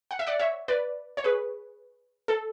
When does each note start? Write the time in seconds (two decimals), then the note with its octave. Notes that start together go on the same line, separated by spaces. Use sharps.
0.11 F#5
0.19 E5
0.27 D5 F#5
0.39 C#5 E5
0.68 B4 D5
1.17 C#5
1.24 G#4 B4
2.28 A4